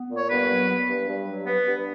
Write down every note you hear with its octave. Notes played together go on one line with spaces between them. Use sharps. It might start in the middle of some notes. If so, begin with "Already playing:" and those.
Already playing: B3
A#2
C#5
G2 B3 B4
F#3
B3
G2
G2
F#3
B3
G2